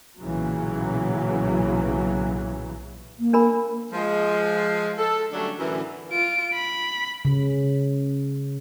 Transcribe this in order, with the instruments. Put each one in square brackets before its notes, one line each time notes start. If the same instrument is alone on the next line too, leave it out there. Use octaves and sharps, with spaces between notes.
[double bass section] B1 A#2 C#3 E3 F#3
[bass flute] A#3
[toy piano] D4 A#4 B5
[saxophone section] F3 G#3
A4
D3 F#3 G3 A3 C#4 D4
F#2 A2 D3 E3
[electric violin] F4 D7
B5
[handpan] C#3